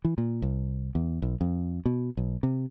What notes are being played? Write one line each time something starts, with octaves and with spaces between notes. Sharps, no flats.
E3
A#2
C2
E2
B1
F2
B2
B1
C3